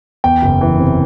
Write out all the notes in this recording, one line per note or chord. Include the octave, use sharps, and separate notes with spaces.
E2 G5
F#1
E3
C3